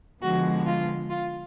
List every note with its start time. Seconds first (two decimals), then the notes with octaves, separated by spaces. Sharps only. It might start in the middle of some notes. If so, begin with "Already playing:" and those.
0.22 D3 F3 G#3 B3 F#4
0.66 F4
1.09 F4